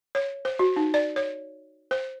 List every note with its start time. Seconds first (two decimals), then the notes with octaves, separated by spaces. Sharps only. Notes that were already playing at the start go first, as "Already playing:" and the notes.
0.15 C#5
0.45 C5
0.59 F#4
0.76 D#4
0.94 D5
1.16 C#5
1.91 C5